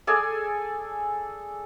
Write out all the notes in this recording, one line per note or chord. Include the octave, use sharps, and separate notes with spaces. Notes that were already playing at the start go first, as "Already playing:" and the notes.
G#4 A4 D5 G#5